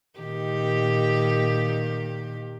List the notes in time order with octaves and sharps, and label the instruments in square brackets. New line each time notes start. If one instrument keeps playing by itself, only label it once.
[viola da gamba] A#2 D#3 G4